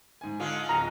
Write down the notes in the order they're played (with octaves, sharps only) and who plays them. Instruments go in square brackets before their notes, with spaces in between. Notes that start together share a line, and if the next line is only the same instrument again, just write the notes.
[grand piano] G#2 G#5
[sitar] D3 G#3 F4
[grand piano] D1 [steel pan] A#5